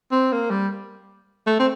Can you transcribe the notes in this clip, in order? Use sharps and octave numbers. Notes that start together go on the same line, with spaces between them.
C4
A#3
G3
A3
C4